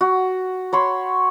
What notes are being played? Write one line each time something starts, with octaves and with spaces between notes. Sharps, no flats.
F#4
C#5 B5 C6